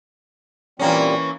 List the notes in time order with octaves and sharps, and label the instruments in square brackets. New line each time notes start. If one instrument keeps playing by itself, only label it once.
[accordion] A#2 G3 C4 [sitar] E3 A#3 C#4